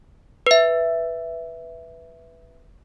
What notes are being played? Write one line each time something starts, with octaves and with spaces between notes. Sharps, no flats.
B4 E5